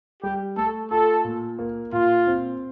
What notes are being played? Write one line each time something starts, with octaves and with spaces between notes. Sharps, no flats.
G3 G4
A3 A4
F4 A4
A#2
A#3
A#2 F4
C4